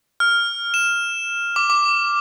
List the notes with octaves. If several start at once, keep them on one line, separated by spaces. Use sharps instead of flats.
F6
E7
D6
D6